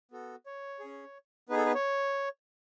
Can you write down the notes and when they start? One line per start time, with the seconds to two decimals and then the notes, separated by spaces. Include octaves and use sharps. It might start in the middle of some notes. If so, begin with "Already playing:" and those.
0.12 B3 F#4 A4
0.46 C#5
0.80 G#4
0.85 C#4
1.49 B3 D#4 G#4 B4
1.57 A4
1.66 B4
1.75 C#5